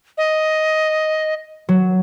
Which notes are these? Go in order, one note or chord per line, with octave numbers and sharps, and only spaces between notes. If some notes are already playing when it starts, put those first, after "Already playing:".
D#5
F#3